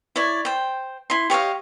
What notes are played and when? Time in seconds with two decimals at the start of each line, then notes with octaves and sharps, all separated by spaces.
0.16 E4 C#5 D5
0.45 C5 G5
1.10 E4 C6
1.30 G4 C#5 D#5 F5